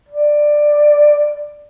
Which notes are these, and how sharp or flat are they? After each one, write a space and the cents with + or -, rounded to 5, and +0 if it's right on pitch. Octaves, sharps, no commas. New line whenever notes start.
D5 +10